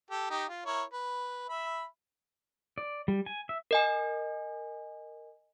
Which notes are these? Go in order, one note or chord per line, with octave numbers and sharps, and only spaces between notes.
G4 A4
D#4 G4
F4
E4 A#4 C#5
B4
E5 B5
D5
G3
G#5
E5
A#4 D#5 G#5